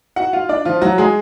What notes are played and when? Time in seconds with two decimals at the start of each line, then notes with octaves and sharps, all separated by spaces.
0.16 F#4 F#5
0.33 F4 F5
0.49 D4 D5
0.65 F3 F4
0.81 F#3 F#4
0.98 G#3 G#4